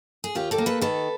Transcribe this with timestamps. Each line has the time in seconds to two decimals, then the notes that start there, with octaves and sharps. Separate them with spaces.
0.24 G#4
0.35 D#2 F4 G4
0.51 G4 A4
0.58 A#3
0.66 A4 B4
0.81 D#3 A4 B4